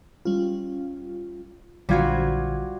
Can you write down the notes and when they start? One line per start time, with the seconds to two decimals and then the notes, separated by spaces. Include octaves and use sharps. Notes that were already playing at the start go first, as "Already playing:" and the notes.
0.25 G3 C#4 F4
1.89 A#1 D3 G3 F4 F#4 G#6